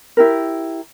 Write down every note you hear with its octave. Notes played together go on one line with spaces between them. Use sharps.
E4 G4 A#4